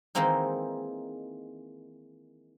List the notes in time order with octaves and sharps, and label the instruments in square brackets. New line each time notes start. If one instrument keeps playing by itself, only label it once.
[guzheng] D#3 E3 G#3 A#3 C4 D#4